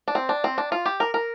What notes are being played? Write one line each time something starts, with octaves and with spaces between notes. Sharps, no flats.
D4
C4
D4
C4
D4
F4
G4
A#4
A#4